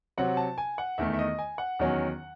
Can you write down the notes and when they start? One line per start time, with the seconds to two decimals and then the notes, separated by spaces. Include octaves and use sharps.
0.18 C3 F#3 C4 F#5
0.37 A5
0.58 G#5
0.78 F#5
0.98 E2 D#3 A3 E5
1.13 E5
1.19 D#5
1.39 G#5
1.58 F#5
1.79 E2 D#3 F#3 C#4